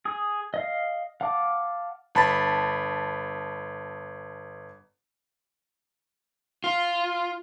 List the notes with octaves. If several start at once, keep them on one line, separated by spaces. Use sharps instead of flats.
G#4 D#6
D#5 F5
F5 F#5 A5 D6
G1 A5 B5 A6
F4